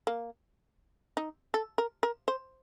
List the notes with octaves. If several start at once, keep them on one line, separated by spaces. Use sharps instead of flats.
A#3
D#4
A4
A#4
A#4
C5